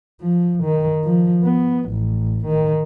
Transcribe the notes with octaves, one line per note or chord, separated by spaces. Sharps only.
F3
D#3
F3
B3
A1
D#3